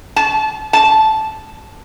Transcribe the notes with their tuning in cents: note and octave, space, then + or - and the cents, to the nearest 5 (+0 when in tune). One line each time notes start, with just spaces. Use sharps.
A5 -30
A5 -10